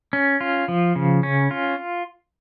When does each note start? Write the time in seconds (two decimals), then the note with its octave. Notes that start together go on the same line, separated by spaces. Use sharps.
0.13 C#4
0.41 F4
0.68 F3
0.96 C#3
1.23 C#4
1.51 F4